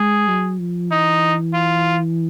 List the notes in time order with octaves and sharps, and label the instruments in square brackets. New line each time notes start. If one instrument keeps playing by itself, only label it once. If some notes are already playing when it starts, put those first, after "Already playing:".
Already playing: [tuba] G#3 [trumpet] G#4
[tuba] F#3
F3
[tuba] E3 [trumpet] D#4
[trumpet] F4